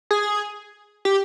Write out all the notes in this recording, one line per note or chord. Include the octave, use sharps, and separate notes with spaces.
G#4
G4